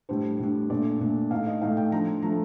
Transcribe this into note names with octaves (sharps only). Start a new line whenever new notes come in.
A2 G3 D4 C5
A2 G3 D4
A#2 A3 D4 D5
A#2 A3 D4
A2 A3 D#4 F5
D#5
A2 A3 D#4 F5
G5
F3 A3 D4 A#5
F3 A3 D4 A#5